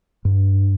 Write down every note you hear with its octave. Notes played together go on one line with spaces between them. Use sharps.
G2